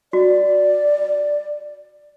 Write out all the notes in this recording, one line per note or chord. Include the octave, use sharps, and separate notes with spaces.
F#4 D5